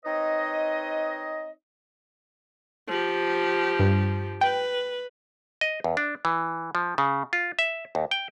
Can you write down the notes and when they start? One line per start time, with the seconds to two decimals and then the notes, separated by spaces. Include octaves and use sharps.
0.04 C4 D#4 B4 C#5 D#5
2.88 F3 G4
3.80 G2
4.41 B4 G5
5.61 D#5
5.84 E2
5.97 D4
6.25 E3
6.75 F3
6.98 C#3
7.33 F4
7.59 E5
7.95 D#2
8.11 G5